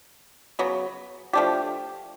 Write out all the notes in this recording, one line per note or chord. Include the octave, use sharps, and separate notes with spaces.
C#3 F#3 B3
F3 A3 D4 G4